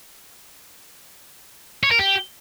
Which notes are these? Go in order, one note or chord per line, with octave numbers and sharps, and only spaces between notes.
C#5
A#4
G4